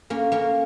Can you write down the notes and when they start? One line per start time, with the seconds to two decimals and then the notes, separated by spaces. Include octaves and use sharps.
0.10 A#3 C#4
0.32 A#3 C#4